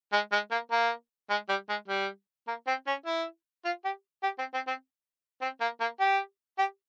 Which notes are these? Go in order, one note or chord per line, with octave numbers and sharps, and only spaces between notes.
G#3
G#3
A#3
A#3
G#3
G3
G#3
G3
A#3
C4
C#4
E4
F4
G4
G4
C4
C4
C4
C4
A#3
A#3
G4
G4